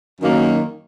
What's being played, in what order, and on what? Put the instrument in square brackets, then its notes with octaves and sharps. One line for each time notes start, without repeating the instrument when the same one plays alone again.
[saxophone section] F#2 D#3 F#3 A#3